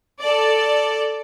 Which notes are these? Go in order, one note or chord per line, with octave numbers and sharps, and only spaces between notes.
A4 D5